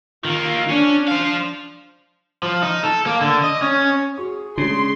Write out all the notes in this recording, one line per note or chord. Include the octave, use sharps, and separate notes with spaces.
D#3 A#3 F4
C#4 D4
C5 F5
F3
D#4
A4
A#3
D3
D#5
C#4
F#4 G#4 C#6
C#3 G#3 C#4 D4 C6